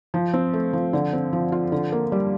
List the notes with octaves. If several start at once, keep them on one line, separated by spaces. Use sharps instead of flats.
F3
C4
A3
F3
D3
C4
F3
F4
D3
A#3
G3